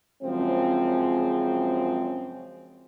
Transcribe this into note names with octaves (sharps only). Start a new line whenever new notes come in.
F#2 C#3 F3 G#3 C4